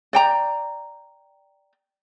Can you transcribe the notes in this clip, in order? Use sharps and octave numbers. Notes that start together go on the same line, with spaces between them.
D5 G5 A#5